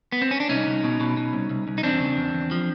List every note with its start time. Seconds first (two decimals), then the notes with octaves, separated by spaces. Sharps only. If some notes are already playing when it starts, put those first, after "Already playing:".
0.12 B3
0.22 C4
0.31 C#4
0.40 D4
0.49 C2 C#4 D#4
0.67 C2
0.84 B2
1.00 B2
1.17 B2
1.33 C2
1.50 C2
1.68 C2
1.78 D#4
1.83 E2 C4 D4
2.00 C#3
2.17 E2
2.34 E2
2.51 F3